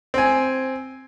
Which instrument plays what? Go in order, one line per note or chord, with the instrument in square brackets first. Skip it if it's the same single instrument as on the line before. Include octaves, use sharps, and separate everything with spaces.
[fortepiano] C4 G#5